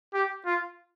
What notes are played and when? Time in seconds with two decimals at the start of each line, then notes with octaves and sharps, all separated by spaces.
0.14 G4
0.46 F4